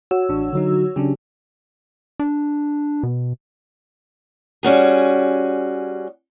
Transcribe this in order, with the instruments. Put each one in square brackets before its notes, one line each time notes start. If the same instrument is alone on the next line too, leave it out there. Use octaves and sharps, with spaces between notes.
[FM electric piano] F#4 C#5 E6
[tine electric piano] A1 D4
D3 F#3 D#4
[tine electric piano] C#3 C#4 D4 [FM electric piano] F#3 G4
[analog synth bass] D4
B2
[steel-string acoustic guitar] G3 C#4 F#4 G#4